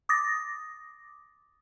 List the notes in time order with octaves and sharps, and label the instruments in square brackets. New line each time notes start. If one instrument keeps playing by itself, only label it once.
[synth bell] D6 D#6 A6 A#6